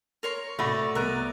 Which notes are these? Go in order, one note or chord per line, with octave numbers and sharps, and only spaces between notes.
A#4 C#5 C6
A2 C3 A3 F#4 B4 D5 B5 A#6
C2 B3 A#4 D5 D#5 A#5 E6 F#6